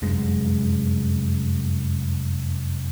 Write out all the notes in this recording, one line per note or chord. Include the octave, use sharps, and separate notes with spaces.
F1 F#2 G#3